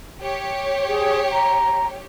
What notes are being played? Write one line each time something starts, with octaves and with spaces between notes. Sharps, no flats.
G4 C#5
G#4
A#5